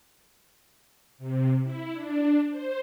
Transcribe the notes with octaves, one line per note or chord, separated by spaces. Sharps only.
C3
E4
D4
C5